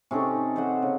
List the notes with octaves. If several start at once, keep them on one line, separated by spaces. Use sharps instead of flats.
C3 C#4 D#4 A4
C5 D#5 F#5
C#3